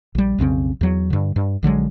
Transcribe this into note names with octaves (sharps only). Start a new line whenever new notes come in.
A#1 G3
B1 F2 C#3 C4
E2 F#3
G2 D3
G2
A#1 D3 F#3 G#3